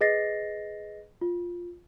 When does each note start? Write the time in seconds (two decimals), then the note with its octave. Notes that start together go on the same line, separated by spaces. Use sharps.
0.01 G#4 B4 D#5 A6 A#6 C7
1.21 F4